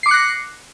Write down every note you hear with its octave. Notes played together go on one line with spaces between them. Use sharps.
D6 F#6 A#6 C7 C#7